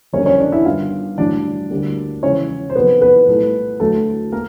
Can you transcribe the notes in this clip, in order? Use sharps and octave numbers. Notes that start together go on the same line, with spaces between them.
F#1 F2 D3 G3 A#3 C#4 C#5
C#4 C#5
D4 D5
E4 E5
G1 G2 D#3 F4 F5
A1 G2 D3 F#3 D4 D5
D2 D3 G3 A#3
E2 C#3 F3 G#3 C#4 C#5
C5
F2 C3 D#3 F#3 A#3 B3 B4
B3 B4
C2 A#2 F#3 A3
D2 D3 F#3 A3 A4
A#3 A#4